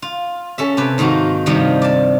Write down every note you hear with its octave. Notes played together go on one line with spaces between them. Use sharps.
F4
C#4 A4 E5
C3 G4 B4
G#2 D#3 A#3 F4 F#4
G2 C3 D#3 F3 G3
D5 A5